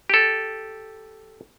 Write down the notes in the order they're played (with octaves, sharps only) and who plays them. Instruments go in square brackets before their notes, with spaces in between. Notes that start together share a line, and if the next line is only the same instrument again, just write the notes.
[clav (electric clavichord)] G4 A4